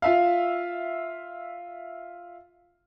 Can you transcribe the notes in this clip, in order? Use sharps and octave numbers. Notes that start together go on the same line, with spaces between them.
F4 E5 F5